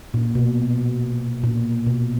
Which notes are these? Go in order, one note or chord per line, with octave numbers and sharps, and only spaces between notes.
A#2
B2
A#2
B2